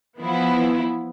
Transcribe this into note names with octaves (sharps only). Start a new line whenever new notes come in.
E3 F3 B3 E4